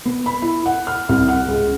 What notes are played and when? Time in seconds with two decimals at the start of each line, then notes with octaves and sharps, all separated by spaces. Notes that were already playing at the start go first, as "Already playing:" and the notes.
0.05 B3
0.26 B5
0.42 E4
0.66 F#5
0.87 F6
1.09 C2
1.29 F#5
1.48 C#2